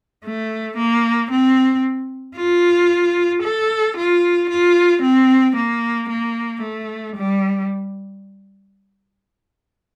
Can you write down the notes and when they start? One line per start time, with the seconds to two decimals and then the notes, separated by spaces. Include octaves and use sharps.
0.24 A3
0.77 A#3
1.31 C4
2.36 F4
3.43 A4
3.97 F4
4.50 F4
5.03 C4
5.56 A#3
6.09 A#3
6.62 A3
7.16 G3